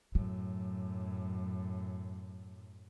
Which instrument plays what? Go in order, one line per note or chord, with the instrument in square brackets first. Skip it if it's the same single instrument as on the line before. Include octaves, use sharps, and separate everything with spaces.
[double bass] F#2 A2 [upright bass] F#3